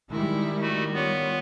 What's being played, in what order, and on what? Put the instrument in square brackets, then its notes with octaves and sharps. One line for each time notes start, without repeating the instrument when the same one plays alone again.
[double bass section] D#3 G3 [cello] G#3 E4
[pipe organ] A3 F#4
[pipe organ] B3 [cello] F4 C#5